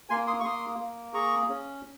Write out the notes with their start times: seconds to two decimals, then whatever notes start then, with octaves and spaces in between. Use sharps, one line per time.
0.09 A#3 G#5 C6
0.27 C6 D#6
0.40 C#6
0.44 A#3 C6 D#6
0.79 A#3
1.14 G#4 A#5 C#6
1.49 C#4